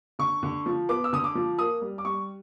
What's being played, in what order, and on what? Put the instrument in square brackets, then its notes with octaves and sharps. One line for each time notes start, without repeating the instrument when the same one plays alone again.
[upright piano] D3 C#6
D3
F3
B3 D6
E6
D3 D#6
D6
F3
A#3 D#6
G3
D6
G3 C#6